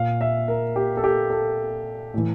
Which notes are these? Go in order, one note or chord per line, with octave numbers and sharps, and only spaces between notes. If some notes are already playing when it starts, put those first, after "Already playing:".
Already playing: A#2 F5
E5
A#4
G4
A4
G4
A4
A2 E3